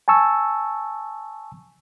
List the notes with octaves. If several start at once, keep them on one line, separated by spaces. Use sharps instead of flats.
G#5 A5 C#6 E6